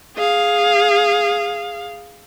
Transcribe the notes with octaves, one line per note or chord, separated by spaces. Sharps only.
G#4 F5